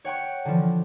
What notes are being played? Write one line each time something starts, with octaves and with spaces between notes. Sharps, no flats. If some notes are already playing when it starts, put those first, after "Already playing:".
C#5 F#5 G5 C#6
D3 E3 F3